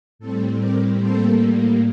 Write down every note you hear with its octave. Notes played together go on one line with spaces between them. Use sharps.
A2 G3 C4 A4
G4 A#4
A2 G3 A#3 A4 C5